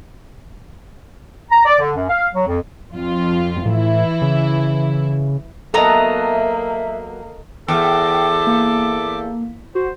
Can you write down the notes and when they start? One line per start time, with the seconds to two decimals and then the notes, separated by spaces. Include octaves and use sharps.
1.51 A#5
1.66 D5
1.79 D3
1.96 F#2
2.09 F5
2.34 F#3
2.48 F2
2.94 F2 F4
3.66 A2 E3 E4
4.22 C#3
5.74 F#3 A#3 B3 A4 D#5 E5 A#5
7.68 E2 A4 G5 D6
8.47 A#3
9.75 F#4 C5